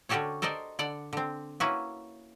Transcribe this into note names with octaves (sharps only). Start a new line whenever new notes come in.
D3 C#4 F#4 G4 A4 C#5
A4 A#4 C5 D5 D#5
D3 D5 F#5
D3 C4
A#3 C#4 E4 F#4 B4 E5